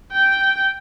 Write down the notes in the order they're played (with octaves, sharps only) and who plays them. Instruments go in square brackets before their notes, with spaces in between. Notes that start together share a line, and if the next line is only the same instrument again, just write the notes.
[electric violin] G5